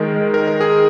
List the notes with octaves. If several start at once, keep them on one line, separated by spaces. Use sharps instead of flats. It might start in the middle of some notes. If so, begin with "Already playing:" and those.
Already playing: D#3 G#3 A#4
A#4
A#4
G#4